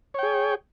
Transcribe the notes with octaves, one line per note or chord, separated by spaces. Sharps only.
G#4 C#5 G5